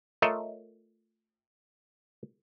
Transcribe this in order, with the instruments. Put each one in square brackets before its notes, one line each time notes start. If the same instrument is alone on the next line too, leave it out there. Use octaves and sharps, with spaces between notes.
[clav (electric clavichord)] A3 F4 A#4 C#5 D#5 E5